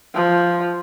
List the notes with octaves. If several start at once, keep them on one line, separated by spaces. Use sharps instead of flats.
F3